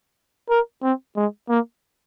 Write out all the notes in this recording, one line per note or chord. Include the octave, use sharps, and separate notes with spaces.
A#4
C4
G#3
A#3